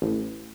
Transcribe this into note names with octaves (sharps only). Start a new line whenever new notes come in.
A1